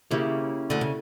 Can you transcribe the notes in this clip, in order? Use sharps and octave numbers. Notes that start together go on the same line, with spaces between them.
C#3 A#3 E4 G4
D2 D3
C#3